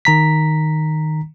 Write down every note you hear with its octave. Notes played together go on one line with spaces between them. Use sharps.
D#3 A#5 B6